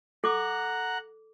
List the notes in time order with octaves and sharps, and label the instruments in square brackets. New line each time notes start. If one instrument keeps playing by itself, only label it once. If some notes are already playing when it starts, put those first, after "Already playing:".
[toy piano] A4 D6 [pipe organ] F#5 A#5 F#6